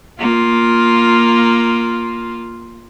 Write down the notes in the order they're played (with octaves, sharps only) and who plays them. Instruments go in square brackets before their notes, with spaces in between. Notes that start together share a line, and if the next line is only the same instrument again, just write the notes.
[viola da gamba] A#3 F4